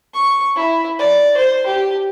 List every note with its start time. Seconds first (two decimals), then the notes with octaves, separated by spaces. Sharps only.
0.14 C#6
0.56 E4
0.99 D5
1.37 C5
1.67 G4